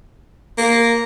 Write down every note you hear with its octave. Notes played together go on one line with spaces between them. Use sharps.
A#3